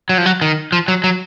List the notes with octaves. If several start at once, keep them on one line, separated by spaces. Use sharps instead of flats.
F#3
F3
F#3
D#3
F3
F#3
F#3